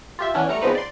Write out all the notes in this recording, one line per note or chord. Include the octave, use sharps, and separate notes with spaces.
F4 G4 E5
E3 B3 C#4 D4 E4
G3 A3 A#5 F6 C#7
C#3 F3 B3 C4 D#4 B4
D5 C6